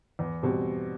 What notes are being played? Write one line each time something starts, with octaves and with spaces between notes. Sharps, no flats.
E2
B2 G3 C4